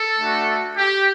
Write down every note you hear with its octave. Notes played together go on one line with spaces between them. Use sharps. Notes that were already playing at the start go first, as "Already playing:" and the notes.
Already playing: A4
A3 D4 F#4
G4